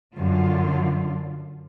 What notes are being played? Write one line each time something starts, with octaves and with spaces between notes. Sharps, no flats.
F#2 D3 F4